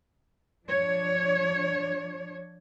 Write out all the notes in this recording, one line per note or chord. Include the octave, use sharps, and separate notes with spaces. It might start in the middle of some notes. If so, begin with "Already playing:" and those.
F3 D4 C#5